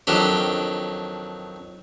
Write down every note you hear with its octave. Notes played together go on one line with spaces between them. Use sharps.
F2 D#3 F#3 D4 G4